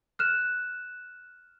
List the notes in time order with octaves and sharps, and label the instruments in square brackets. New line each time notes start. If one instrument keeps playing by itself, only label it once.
[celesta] F6 F#6 E7